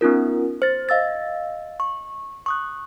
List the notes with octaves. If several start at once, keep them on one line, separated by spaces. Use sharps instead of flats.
B3 C#4 D#4 F4 A#4
C5 A6
D#5 F5 E6 A6
C#6
C#6 D#6 F#6